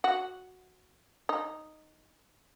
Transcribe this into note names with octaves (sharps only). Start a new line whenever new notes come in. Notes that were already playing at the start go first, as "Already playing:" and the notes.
F#4
D#4